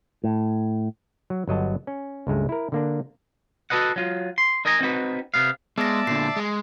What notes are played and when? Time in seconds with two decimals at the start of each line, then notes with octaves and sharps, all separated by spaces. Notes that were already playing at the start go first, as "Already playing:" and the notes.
0.24 A2
1.30 F#3
1.47 G1 F#3 D#5 A5
1.87 C#4
2.27 C#2 G2 G#3 A3
2.49 E4 A#4
2.72 D3 A#3 D4
3.70 F#4 A4 B4 D#5 F#5
3.96 F#3 F4
4.38 C6
4.65 D#4 A#4 D#5 G#5 A#5
4.81 C4 D#4 F#4 B4
5.34 C3 B3 F5
5.78 G#3 B3 D5 E5 A5 A#6
6.07 A#2 D3 C7
6.36 G#3